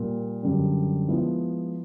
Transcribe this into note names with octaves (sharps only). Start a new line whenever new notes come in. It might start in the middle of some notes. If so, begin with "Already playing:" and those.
Already playing: A#2 G3 A#3
F#2 D3 G3
F3 G#3 B3 E4